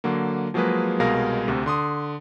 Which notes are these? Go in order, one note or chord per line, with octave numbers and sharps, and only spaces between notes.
D3 F#3 A#3
F3 F#3 G#3 A#3 G#4 B4
C2 B2 G#3 A#4 F5 A#6
D2 C3
D3 C6 D#6